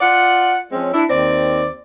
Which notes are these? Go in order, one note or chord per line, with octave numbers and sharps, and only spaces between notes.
F4 D5 F#5
F3 G#3 C4 C#4
D4 E4
D#2 C4 D5